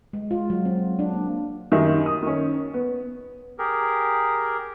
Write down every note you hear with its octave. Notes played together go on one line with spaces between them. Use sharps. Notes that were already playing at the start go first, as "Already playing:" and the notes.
G#3
F4
F#3
C4
D4
A#3
F#2 D#3 G4 D#5 E5
D#6
D#3 C#4
B3
G4 G#4 A#4